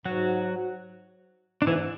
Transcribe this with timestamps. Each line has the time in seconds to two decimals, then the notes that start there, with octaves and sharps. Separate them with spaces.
0.05 G#2 F#3 F#4
1.62 D4
1.66 G#2 E3 E4